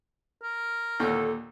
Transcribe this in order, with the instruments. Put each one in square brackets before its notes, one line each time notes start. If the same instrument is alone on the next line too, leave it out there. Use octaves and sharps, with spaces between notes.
[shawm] A#4
[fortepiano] D#2 A#2 D3 [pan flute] A4